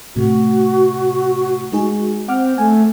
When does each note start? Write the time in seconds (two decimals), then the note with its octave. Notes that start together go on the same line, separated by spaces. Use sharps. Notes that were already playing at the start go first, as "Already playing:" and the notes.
0.16 A2 C3 A3 F#4
1.72 G#3 D#4 G#4
2.28 C4 F#5 D6 F6
2.58 A3 G#5